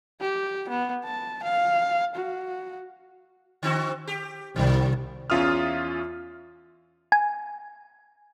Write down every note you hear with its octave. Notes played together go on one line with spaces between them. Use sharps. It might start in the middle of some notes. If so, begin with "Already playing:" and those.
G4
B3
A5
F5
F#4
D3 C4 F#4
G4
C2 D3 F#3
E2 C#4 F4 E5 D#6 F6
G#5